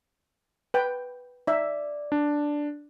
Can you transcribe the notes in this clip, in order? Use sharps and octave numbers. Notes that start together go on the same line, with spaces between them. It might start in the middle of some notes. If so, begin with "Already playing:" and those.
B4 G5
D#4 D5 E5
D4